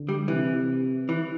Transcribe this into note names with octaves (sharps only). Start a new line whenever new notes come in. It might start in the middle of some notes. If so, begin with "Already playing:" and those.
Already playing: D3
G3
C3 E3
E3